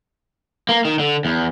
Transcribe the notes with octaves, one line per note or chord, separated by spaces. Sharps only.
A#3
D#3
D3
E2